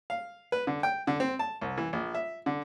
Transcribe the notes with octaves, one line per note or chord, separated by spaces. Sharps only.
F5
B4
D3
G5
D3
C4
A5
C2
E3
A#1
E5
D3